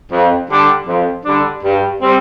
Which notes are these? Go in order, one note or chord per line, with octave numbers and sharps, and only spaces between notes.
F2
D3 G3 D4
F2
D3 G3 D4
G2
G3 C4